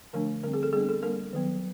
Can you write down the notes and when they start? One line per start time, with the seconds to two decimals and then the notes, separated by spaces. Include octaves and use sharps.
0.13 D3 F3 A3 D4 A#4
0.43 D3 G3 C4 A#4
0.53 G#4
0.63 A4
0.73 G3 B3 D4 G#4
0.89 A4
1.03 G3 A#3 D4 A#4
1.33 D#3 F#3 B3